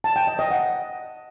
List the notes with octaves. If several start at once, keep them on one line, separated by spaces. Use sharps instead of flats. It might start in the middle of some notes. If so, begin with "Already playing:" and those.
A5
G5
D#5
D#5
F#5